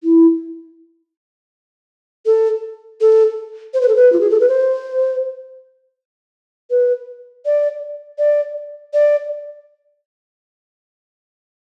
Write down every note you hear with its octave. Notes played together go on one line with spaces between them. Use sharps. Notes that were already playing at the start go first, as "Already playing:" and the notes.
E4
A4
A4
C5
B4
A4
B4
F4
G#4
A4
B4
C5
B4
D5
D5
D5